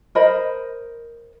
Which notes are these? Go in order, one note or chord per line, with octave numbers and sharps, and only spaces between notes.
A#4 C5 D#5 B5